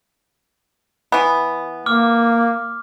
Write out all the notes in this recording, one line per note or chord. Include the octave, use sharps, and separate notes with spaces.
E3 B3
A#3 D6 F6